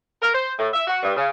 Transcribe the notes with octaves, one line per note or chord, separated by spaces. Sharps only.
A#4
C5
A2
E5
F#4
G2
C#3